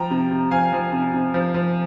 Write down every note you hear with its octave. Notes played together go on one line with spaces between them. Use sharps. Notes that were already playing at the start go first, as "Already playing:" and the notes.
Already playing: F3 G5 A#5
C3
C3
F3 F5 G#5
F3
C3
C3
F3
F3